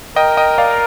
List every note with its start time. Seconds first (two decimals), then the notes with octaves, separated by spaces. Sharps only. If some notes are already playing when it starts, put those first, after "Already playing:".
0.16 A#4 D#5 G5
0.37 D#5 G5
0.58 D5 F5